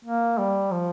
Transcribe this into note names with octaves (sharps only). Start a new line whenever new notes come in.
A#3
G3
F3